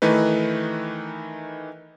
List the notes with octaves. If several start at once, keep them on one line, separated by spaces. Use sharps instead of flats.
D#3 E3 A3 D#4 B4